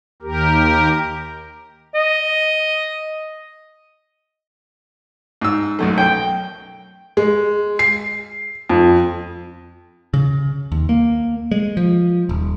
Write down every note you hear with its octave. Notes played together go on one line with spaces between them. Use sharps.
D#2 G4 A#4
D#5
G#2 E6
B1 F#2 A3
G5
G#3
C7
F2
C#3
D#2
A#3
G#3
F3
D#1